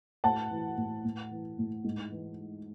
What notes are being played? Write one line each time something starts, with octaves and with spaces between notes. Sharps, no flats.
A2 F#5 A5
E3
A2
A2
E3
A2
G#2
E3